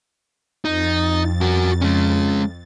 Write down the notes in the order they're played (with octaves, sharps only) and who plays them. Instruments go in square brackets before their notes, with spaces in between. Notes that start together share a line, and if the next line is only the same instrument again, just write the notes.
[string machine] F2 A6 [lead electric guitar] D#4
[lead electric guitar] F#4 A#4
G#3 C#4